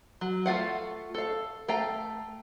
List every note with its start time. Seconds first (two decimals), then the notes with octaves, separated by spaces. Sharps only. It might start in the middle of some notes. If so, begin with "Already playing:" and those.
0.21 F#3
0.46 A3 F4 F5 F#5
1.14 A4 F5
1.68 A3 F5 G5 A#5